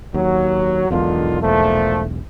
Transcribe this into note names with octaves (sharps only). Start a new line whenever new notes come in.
D#2 F#3
E1 B1 E2 D3 D#3 F4
A#2 F3 A3